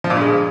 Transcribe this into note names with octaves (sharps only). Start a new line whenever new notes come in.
F3
A#2
G2
G#3